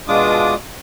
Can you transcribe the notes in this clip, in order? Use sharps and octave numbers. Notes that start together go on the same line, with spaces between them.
B2 G#3 D4 F4 D6 D#6